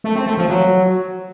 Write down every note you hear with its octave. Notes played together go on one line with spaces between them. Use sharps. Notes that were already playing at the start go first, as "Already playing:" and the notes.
A3
C4
A3
F3
F#3